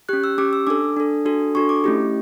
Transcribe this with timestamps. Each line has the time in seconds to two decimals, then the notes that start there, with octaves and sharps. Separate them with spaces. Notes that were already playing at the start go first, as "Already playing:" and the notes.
0.09 C#4 G4 F#6
0.24 E6
0.38 C#4 G4 D6
0.53 E6
0.67 D4 A4 D6
0.97 D4 A4
1.26 D4 F#4 A4
1.55 D4 F#4 A4 C#6
1.69 D6
1.84 A3 C#4 E4 G4